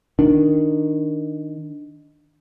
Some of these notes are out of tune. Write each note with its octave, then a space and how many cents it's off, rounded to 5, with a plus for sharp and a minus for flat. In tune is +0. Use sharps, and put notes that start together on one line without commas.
D#3 +0 D4 +0